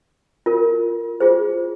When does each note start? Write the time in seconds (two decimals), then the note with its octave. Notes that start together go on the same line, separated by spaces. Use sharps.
0.46 F4 A#4
1.20 F4 G#4 C5